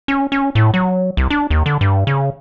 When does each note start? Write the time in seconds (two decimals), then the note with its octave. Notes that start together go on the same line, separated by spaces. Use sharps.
0.08 C#4
0.32 C#4
0.55 A2
0.74 F#3
1.17 C2
1.30 D4
1.50 D#2
1.66 D3
1.81 G2
2.07 C#3